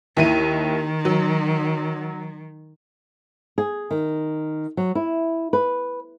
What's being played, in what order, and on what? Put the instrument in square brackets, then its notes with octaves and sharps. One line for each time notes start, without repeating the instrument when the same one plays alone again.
[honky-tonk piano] D#2 E4 D#7 [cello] D#3
[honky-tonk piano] F#3
[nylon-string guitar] G#4
D#3
F#3
E4
B4